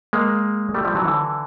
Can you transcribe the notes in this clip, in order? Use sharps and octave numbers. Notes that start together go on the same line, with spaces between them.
G#3 A#3
G3 A3
F3 G3
E3 F#3
D3 E3